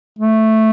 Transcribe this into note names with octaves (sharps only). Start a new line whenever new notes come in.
A3